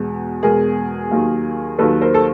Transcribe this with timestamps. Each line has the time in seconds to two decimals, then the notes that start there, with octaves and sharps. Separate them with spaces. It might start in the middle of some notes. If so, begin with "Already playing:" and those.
Already playing: E2 B2 G#3
0.43 E2 B2 G#3 G#4 A#4
1.11 D#2 D#3 F#3 A#3
1.78 D#2 D#3 F#3 A#3 A4 B4
2.01 A#4 C5
2.14 A4